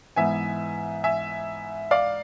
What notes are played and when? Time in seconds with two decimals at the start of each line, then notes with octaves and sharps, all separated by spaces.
0.16 G#2 E3 B3 E5 G#5
1.04 E5 G#5
1.91 D5 F5